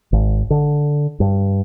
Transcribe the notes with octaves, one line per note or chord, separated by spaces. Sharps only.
G#1
D3
G2